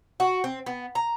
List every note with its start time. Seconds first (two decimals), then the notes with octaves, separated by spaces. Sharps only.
0.20 F#4
0.44 C4
0.66 B3
0.95 A#5